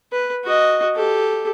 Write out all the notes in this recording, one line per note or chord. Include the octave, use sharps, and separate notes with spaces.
B4
F#4 D#5
G4 A4